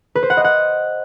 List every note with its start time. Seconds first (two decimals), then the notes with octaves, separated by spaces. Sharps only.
0.15 B4
0.23 C5
0.30 F#5
0.37 D#5
0.44 F#5